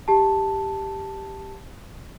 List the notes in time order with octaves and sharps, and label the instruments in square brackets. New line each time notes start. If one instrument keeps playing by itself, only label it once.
[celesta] G4 A5